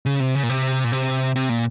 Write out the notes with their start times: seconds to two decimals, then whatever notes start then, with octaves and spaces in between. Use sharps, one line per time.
0.06 C#3
0.20 C3
0.35 C#3
0.43 A#2
0.49 C3
0.84 A#2
0.92 C3
1.36 C3
1.49 A#2